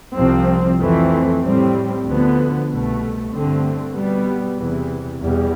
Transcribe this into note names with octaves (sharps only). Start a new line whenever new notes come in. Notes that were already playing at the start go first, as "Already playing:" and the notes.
C2 C3 F3 C4
F2 E3 A3 C4
A2 G3 C4
D2 D3 F3 B3
C2 B2 A3
G2 D3 A3 C4
B2 G3 B3
E2 C3 E3
E2 B2 G3